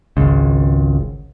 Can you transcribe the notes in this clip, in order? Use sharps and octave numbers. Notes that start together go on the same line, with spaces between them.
G#1 C#2